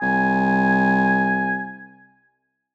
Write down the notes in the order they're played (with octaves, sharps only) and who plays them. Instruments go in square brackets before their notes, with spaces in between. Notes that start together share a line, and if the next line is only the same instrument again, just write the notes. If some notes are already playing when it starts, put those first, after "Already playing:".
[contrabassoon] C2 [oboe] G#5